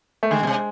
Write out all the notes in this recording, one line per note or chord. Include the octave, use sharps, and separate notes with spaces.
A3
D3 G#3
B2
C3